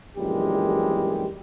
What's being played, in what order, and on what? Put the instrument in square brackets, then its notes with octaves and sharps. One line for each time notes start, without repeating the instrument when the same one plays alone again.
[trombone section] A#1 F#2 E3 G3 G#3 G4